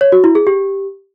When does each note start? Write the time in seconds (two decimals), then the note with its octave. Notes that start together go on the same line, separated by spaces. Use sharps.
0.01 C#5
0.12 F#4
0.24 E4
0.35 G#4
0.47 G4